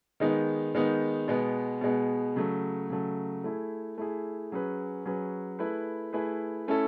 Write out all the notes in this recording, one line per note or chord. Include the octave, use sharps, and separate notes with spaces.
D#3 G#3 B3 D#4
D#3 G#3 B3 D#4
B2 G#3 B3
B2 G#3 B3
C#3 F#3 A3
C#3 F#3 A3
A3 E4 G#4
A3 E4 G#4
F#3 C#4 G#4 B4
F#3 C#4 G#4 B4
A3 E4 G#4 B4
A3 E4 G#4 B4
A3 C#4 E4 A4